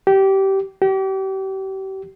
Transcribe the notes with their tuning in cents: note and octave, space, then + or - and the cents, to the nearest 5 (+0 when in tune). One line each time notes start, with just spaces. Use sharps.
G4 -20
G4 -35